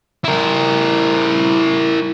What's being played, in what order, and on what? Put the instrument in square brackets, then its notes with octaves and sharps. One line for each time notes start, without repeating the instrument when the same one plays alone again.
[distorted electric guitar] E4 A#4